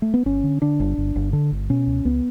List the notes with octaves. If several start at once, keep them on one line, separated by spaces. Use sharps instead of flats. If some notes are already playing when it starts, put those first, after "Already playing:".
A3
B3
G1 C#4
D3
D3 D4
G1
G1
G1
D3
G1
B2 C#4
C#2
C#2 B3